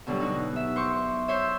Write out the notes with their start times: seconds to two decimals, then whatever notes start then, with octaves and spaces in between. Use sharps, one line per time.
0.07 B2 D3 F#3 G3
0.20 D#4 F#4
0.56 E5
0.76 C5 C#6 D6
1.28 C5 C#5 E5